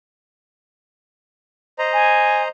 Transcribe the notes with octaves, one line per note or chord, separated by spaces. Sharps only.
C5 D#5 A#5
G#5